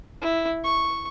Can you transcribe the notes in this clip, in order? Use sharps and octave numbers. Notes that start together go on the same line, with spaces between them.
E4
C#6